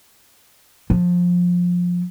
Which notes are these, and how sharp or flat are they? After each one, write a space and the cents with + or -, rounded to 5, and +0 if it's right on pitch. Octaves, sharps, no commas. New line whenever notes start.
F3 +20